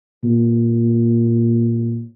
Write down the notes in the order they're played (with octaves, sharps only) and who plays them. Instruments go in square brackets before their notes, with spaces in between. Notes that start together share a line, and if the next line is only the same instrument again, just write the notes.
[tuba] A#2